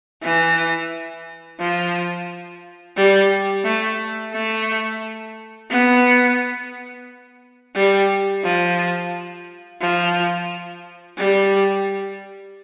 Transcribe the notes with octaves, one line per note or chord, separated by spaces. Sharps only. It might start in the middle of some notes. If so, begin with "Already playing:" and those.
E3
F3
G3
A3
A3
B3
G3
F3
F3
G3